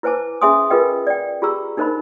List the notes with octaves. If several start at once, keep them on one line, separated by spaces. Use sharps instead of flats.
E4 B4 C5 G#5 A5 D6
C#4 G#4 E5 G#5 C6 D#6
F4 G#4 A#4 B4 D#5 G5
D5 G5
F4 G4 G#4 A#5 C#6 E6
D4 D#4 A#4 C5 D#5 B5